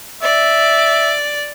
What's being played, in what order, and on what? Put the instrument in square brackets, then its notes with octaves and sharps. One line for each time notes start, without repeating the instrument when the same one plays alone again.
[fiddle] D5 [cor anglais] E5